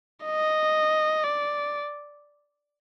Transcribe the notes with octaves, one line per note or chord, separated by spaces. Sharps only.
D#5
D5